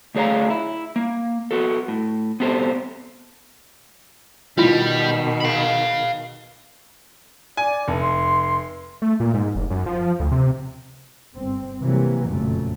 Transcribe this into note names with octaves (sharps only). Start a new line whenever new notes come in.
D2 A3 G#4 C#5 F5 A#5
E4
A#3
B3 F#4 A4
A2
B3 C4 G4 A4 C5
B2 D#3 G3 E4 F4
F5 B5
D5 G#5
F1 A5
C6
A3
A#2
G#2
F1
F#2
F3
D2
C3
G1 C4
C3 E3 F#3 G3 A#3
F#1 F2 A#2 C#3 F#3 A3